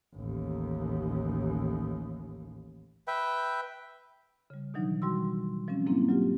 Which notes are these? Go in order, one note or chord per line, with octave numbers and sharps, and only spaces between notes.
A1 D#2
B4 E5 G5
C#3 G3
B2 D#3 E3 F#3 D4 D#4
F3 G3 F#4 C6 E6
F3 G3 C4 C#4
G#2 F#3 A#3 C4 D4 E4
F#3 F4 G4